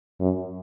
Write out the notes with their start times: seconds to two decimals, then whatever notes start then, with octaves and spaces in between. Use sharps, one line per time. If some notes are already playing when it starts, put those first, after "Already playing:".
0.20 F#2